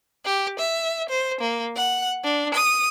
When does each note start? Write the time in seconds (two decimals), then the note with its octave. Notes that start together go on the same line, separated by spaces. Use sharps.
0.25 G4
0.59 E5
1.09 C5
1.41 A#3
1.76 F#5
2.24 D4
2.54 D#6